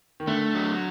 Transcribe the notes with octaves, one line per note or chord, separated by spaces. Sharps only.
D#3
D3 A3
F#3